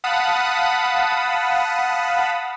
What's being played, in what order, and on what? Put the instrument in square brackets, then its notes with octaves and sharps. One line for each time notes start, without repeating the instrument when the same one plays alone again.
[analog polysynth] F5 F#5 A5 B5 D#6